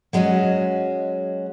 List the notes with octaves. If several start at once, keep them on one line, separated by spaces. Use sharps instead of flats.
F#3 G#3 C#4 F#4 D#5